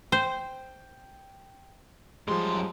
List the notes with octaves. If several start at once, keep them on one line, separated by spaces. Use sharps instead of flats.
C5 G5
F#2 F3 G3 G#3 C6